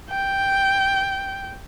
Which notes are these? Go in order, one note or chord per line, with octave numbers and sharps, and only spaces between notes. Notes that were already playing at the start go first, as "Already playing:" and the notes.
G5